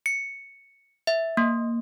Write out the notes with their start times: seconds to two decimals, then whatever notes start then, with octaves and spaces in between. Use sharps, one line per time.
0.06 C#7
1.07 E5
1.37 A#3